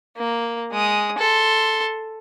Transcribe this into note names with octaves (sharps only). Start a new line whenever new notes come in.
A#3
G#3 D#6
A4 C6